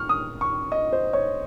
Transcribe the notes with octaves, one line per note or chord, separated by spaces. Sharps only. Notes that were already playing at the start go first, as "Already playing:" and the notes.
Already playing: C#6 F6
D#6
C#6
D#5
C5
C#5